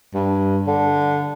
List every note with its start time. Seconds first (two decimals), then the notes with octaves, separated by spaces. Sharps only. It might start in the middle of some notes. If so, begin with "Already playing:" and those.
0.14 G2
0.67 D3